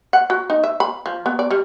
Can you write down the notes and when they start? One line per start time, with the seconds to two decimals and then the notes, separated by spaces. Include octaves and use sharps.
0.13 F#5
0.30 F#4
0.50 D#4
0.64 E5
0.80 B5
1.06 F3
1.26 B3
1.39 D5
1.51 G3